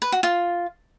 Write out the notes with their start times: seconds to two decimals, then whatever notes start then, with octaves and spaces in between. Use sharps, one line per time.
0.02 B4
0.12 F#4
0.23 F4